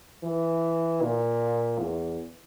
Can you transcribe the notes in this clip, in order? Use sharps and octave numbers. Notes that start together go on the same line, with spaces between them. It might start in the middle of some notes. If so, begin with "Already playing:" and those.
E3
A#2
E2